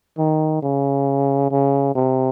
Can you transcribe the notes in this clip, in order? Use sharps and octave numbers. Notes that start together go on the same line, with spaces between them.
D#3
C#3
C#3
C3